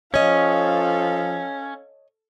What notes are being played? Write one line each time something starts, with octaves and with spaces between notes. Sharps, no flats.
F3 C#4 A4 C#5 D#5 F5